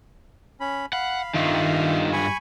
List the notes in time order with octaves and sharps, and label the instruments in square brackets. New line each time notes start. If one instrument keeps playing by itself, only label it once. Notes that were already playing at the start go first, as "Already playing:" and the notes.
[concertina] C#4 B5
[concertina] F5 B5 [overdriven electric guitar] F#5
[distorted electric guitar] G2 F4 [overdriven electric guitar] D#3 [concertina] E5 F5
[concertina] G#5 B5 C#6